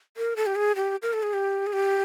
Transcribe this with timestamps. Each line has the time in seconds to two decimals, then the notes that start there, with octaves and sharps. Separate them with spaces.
0.17 A#4
0.36 A4
0.46 G4
0.56 G#4
0.76 G4
1.02 A#4
1.13 A4
1.23 G#4
1.33 G4
1.67 G#4
1.73 G4